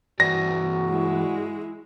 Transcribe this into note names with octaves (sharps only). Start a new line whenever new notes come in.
G2 E3 F#4 D5 A#6
G#3 E4